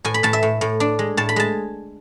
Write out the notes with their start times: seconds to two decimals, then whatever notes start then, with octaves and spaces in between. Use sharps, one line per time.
0.04 A2 G#5
0.14 B5
0.23 A2 A5
0.33 E5
0.43 A2
0.61 A2
0.80 D4
0.99 G#3
1.17 A2 A5
1.29 B5
1.36 G#3 A5